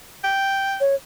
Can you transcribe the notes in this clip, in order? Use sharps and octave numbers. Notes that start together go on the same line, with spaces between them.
G5
C#5